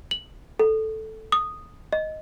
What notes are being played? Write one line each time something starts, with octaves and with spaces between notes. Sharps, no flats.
F#7
A4
D#6
D#5